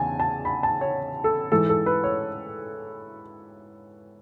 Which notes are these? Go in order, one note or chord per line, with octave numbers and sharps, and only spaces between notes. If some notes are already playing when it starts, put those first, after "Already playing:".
Already playing: E2 C#3 G#5 A5
A5
B5
A5
C#5
A4
G#2 E3 A4
A4
B4
C#5